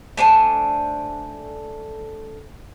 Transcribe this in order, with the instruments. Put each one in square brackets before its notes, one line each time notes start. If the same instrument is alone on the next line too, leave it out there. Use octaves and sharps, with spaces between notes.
[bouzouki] A3 D4 C5 G#5